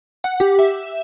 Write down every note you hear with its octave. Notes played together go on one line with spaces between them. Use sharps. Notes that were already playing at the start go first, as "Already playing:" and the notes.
F#5
G4
E5